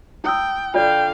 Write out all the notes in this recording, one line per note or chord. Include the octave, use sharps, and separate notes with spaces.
E4 G5 D#6 E6
D3 F4 C#5 D5 F5 G5